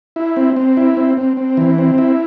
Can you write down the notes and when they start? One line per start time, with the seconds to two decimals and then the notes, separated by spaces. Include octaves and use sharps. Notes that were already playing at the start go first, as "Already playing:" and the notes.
0.16 E4
0.36 C4
0.56 C4
0.77 E4
0.97 C4
1.17 C4
1.37 C4
1.57 E3
1.78 C4
1.98 E4